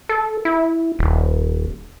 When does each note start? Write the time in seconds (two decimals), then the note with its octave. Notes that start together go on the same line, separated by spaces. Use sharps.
0.09 A4
0.45 E4
0.99 D#1